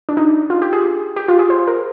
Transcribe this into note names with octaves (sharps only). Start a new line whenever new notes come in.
D4
D#4
F4
G4
G#4
G4
F4
G#4
C5
A#4